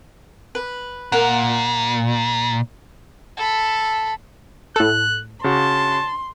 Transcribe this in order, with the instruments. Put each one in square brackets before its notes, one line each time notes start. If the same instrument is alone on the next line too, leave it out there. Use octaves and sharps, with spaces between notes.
[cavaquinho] B4
[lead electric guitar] A#2 [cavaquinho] A#4 F#5
[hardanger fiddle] A4 B5
[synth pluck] A2 A4 [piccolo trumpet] F#6
[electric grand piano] C#3 F#4 [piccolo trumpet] A5 [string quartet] C6